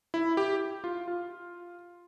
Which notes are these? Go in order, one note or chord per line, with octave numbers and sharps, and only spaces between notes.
E4
G4
F4
F4